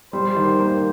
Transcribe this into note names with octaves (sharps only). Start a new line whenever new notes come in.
G3 C5
D#3
A#3